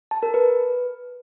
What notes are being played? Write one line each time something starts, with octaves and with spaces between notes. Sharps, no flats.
A5
A#4
B4